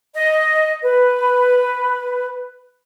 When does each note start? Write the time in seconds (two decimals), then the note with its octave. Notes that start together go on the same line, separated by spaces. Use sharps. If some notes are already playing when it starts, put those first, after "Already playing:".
0.15 D#5
0.83 B4